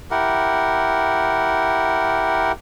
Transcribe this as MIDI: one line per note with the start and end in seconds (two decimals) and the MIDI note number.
0.11 2.52 64
0.11 2.52 67
0.11 2.52 70
0.11 2.52 78